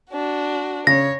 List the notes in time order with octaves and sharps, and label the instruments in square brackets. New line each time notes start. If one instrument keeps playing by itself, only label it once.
[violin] D4 F#4
[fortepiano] C#3 [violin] C#5 [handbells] A#6